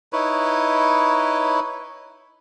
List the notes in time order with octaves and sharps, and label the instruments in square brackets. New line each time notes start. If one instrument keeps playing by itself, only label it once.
[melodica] D#4 E4 B4 C#5